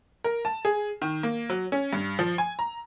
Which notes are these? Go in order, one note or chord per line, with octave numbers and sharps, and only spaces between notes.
A#4
A5
G#4
D#3
A#3
F#3
C#4
G2
F3
G#5
A#5